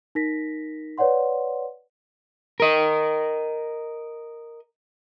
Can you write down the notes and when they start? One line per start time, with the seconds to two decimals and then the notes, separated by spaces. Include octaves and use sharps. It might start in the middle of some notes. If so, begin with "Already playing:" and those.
0.15 D#4 A#4 A#6 B6
0.98 B4 C#5 D5 F#5 C6
2.60 A#4 D#5